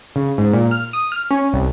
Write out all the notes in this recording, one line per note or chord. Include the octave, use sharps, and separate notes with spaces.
C#3
G#2
A#2
F6
D#6
F6
C#4
C2